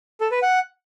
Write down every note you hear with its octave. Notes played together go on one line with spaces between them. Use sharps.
A4
B4
F#5